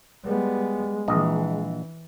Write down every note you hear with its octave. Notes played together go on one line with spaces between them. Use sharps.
G3 G#3 B3
A#1 E3 D#5